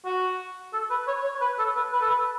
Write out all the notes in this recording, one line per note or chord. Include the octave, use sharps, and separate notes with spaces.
F#4
A4
B4
C#5
C#5
B4
A4
B4
B4
A4
B4